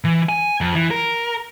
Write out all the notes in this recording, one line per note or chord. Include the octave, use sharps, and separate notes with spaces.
E3
G#5
F2
E3
A#4